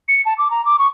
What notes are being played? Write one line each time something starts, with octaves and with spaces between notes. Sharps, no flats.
C#7
A5
D6
A#5
D6
C#6